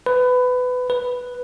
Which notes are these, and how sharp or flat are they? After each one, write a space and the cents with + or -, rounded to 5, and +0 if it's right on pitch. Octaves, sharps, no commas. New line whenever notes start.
B4 +20
B4 +0